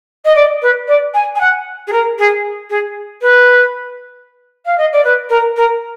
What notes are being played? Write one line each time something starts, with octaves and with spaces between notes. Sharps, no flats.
D#5
D5
B4
D5
G#5
G#5
F#5
G#4
A#4
G#4
G#4
B4
F5
D#5
D5
B4
A#4
A#4